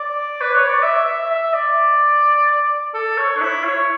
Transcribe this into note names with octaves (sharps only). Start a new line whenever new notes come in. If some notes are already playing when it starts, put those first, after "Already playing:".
Already playing: D5
B4
C#5
D5
E5
E5
E5
D5
A4
C#5
D4
E4
C#5